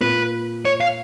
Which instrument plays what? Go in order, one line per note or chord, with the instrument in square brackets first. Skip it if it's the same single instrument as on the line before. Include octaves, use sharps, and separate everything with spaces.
[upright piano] A#2 [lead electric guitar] B4
[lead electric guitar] C#5
F5